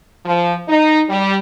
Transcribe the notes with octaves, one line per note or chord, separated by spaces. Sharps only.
F3
D#4
G3